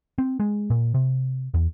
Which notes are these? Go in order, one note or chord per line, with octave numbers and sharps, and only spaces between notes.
C4
G#3
A#2
C3
E2